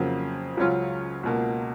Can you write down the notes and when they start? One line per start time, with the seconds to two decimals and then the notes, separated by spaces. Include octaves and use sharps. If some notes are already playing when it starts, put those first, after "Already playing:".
Already playing: F2 C#3 F#3 A#3
0.57 C#2 C#3 F#3 C#4 F4
1.23 C#2 B2 A#3